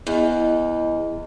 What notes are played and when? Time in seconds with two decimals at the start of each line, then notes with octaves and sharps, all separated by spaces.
0.07 E2 E4 D#5